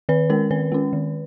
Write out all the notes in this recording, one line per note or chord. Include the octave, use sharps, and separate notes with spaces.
D#3 B4
G#3 C#4 A#4
D#3 B4
G#3 C#4
D#3